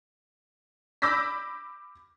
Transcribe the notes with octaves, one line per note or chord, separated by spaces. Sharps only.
B5 D6 E6 G6 A#6 B6